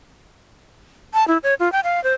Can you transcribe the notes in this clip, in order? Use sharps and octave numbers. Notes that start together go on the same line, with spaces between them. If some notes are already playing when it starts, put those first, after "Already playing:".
A5
E4
C#5
F4
G5
F5
C5